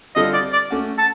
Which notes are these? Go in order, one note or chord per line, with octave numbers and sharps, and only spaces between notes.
D3 G3 C4 F4 A4 D#5
D5
D5
A3 C#4 F#4
A5